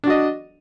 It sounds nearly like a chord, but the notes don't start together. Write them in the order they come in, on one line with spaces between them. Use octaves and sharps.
D4 F#4 D#5